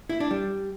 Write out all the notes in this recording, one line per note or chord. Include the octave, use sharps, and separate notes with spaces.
E4
D4
G3